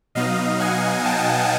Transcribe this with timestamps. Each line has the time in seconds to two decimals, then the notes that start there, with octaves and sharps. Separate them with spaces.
0.15 B2 F#3 B3 D#4 D#5 F5
0.60 F#5 G#5
1.04 G5 A5